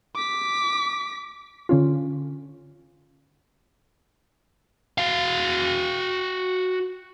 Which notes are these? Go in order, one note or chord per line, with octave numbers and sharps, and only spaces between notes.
D6 B6
D3 C#4 F4
F#4 F5